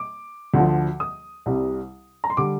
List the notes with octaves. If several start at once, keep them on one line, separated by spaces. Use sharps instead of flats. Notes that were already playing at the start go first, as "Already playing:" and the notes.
Already playing: D6
D2 D3 F3
D#6
C2 C3 G3
A#5
C6
D3 G3 D6